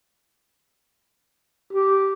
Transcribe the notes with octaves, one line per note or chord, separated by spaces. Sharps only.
G4